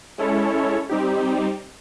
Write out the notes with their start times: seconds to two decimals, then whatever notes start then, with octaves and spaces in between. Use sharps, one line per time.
0.18 G#3 C#4 E4 A4 C#5
0.89 G3 C4 D#4 G4